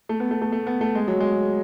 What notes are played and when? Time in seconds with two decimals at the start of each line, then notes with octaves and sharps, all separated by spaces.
0.09 A3
0.20 B3
0.31 A3
0.42 A3
0.52 A3
0.67 B3
0.81 A3
0.95 G#3
1.08 F#3
1.20 G#3